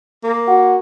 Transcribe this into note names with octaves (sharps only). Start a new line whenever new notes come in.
A#3
F#4